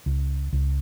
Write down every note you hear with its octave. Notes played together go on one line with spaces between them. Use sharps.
C#2
C#2